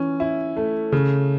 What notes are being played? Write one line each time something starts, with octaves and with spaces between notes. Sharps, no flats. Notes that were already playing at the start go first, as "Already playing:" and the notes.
Already playing: E3 C#4
E4
A3
C#3